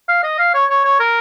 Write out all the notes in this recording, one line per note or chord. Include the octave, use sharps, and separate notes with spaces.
F5
D#5
F5
C#5
C#5
C#5
A#4